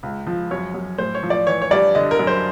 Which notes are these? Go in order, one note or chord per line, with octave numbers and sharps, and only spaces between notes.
C#2
F3
F#2 C#5
F#2
A2 C5
C#5
F3
D5
E3 C#5
C#5
G2 D5
D3 D#5
A#4
F#2
C5